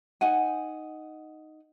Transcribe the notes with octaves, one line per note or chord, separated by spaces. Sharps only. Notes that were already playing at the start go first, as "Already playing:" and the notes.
D#4 F#5 G#5